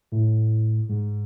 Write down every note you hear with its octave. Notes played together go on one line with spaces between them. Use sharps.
A2
G#2